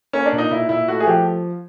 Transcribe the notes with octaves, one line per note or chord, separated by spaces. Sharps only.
A#3 C#4
D4
A#2
D#4
A#2 E4
A#2 E4
A3 F#4
G#4
F3 G4